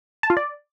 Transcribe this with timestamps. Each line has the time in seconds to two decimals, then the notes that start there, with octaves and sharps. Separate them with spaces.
0.23 A5
0.30 F4
0.37 D5